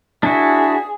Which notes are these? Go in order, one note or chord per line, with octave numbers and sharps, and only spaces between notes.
D4 E4 F#4 G#4